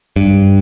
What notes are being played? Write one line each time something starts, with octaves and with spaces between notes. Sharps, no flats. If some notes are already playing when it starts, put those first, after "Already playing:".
G2